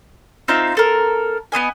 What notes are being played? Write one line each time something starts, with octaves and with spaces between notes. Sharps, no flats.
C4 D#4 F4 E5
C4 A4 A#4
B3 C4 D#5 G#5